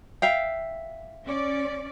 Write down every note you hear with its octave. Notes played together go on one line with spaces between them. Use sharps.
E5 F5 G5
C#4 D5